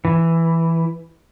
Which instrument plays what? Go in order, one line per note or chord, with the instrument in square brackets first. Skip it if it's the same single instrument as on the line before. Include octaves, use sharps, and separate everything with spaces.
[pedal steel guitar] E3